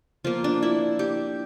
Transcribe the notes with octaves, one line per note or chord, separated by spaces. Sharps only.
F3 A#3 F4
D4
E4
G4